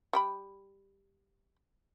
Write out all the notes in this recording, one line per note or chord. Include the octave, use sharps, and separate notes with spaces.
G3 G5 B5